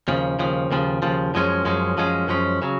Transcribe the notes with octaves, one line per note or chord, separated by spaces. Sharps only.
D#2 C#3 F3
D#2 C#3 F3
D#2 C#3 F3
D#2 C#3 F3
F#2 F3 G#3 C#4
F#2 F3 G#3 C#4
F#2 F3 G#3 C#4
F#2 F3 G#3 C#4
C#3 F#3